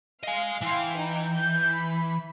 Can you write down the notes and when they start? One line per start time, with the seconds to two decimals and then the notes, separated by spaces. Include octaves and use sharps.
0.24 D#5 F5 G#5
0.62 E3 F5 G5 C6
0.96 D#4 G5 A#5
1.33 G6
1.67 B5